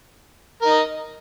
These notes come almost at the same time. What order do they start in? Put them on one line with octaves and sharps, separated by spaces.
A#4 D#4 D#5